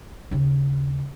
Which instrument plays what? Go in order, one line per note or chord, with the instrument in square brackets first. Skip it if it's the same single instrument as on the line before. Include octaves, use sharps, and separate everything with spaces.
[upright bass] D#2 C#3